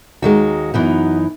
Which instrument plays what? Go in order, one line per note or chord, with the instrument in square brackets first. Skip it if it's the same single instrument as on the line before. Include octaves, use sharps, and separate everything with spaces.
[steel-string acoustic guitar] D#2 D#3 G#3 F#4
F#2 E3 B3 D#4